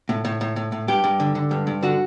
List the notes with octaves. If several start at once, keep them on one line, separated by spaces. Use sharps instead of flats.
A2
A2
A2
A2
A2
G2 G4
G2
D3
D3
G2
G2
D3 F#4